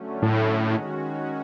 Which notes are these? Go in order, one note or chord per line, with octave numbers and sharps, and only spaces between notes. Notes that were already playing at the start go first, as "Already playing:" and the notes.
Already playing: D3 F#3 A3 C#4
A2
D#3 G#3 C#4 F#4